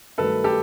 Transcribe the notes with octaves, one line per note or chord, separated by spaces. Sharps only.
G2 D#3 F#3 A3 A4 B4
G4 A4